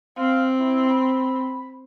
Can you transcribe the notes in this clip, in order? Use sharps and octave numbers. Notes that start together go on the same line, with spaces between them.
C4 F5
E4
B5